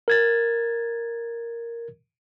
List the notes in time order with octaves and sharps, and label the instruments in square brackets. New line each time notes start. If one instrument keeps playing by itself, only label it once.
[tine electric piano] A#4 G#6 A6